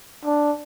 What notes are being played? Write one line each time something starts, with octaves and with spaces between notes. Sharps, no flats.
D4